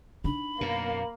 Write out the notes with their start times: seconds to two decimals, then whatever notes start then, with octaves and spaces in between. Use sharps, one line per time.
0.24 D4 D#4 B5
0.61 F#2 B2 A#3